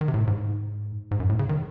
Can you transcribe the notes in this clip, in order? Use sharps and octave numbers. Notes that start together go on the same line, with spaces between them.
D#3
C3
A2
G#2
G#2
F#2
A2
C#3
D#3